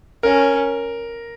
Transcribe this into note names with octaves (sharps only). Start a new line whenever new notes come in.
C#4 A#4